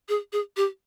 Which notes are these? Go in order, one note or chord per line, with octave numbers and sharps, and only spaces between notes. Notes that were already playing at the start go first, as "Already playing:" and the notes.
G#4
G#4
G4